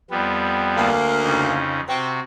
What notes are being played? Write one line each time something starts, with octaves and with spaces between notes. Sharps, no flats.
F2 G3 B3
D2 A#3
F2 C#3 D#4
C3 C4 F#4